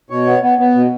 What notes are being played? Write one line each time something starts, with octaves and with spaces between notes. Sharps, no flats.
B2 C#5
B3
B3
B3
B2